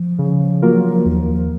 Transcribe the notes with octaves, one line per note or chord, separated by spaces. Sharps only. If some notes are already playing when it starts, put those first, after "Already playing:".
Already playing: F3
C#3
F#3 A#3 F4 A#4
D#2